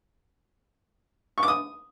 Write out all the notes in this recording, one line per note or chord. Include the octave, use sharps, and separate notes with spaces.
C#6
D6
D#6